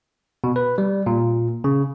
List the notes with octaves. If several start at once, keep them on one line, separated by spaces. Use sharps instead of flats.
B2
B4
G3
A#2
C#3